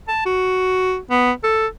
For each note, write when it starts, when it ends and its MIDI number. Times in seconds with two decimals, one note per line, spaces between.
0.08 0.23 81
0.25 0.98 66
1.11 1.32 59
1.43 1.67 69